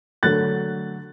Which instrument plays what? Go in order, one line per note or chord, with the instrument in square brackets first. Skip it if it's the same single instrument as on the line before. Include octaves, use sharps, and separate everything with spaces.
[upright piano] D3 F#3 A3 F#6 A6